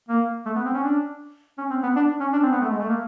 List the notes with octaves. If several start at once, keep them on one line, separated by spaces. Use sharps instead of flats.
A#3
A3
B3
C4
C#4
D4
C#4
C4
B3
D4
C#4
D4
C4
B3
A3
G#3
A3
A#3